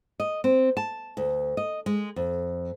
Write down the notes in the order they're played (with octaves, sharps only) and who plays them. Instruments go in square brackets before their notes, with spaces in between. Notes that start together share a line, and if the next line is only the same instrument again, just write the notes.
[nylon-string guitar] D#5
C4
A5
D2
D#5
G#3
F2